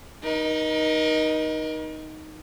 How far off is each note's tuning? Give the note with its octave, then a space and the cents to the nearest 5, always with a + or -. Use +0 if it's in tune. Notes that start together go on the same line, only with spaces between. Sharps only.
D#4 +0 A#4 +40